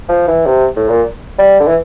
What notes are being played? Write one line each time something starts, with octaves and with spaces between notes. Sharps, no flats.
F3
E3
C3
A2
A#2
G3
D3
E3